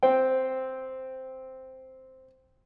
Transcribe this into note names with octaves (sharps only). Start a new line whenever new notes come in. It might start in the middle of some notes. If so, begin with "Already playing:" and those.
C4 G5